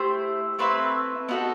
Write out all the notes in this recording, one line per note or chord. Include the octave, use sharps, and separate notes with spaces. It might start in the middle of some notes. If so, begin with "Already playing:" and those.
Already playing: A3 E4 G4 C5
A3 C4 E4 B4
B3 D#4 F#4 A4